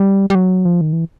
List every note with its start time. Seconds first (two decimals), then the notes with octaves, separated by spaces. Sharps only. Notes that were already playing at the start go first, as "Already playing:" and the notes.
Already playing: G3
0.30 G3
0.35 F#3
0.65 F3
0.81 D#3
0.93 E3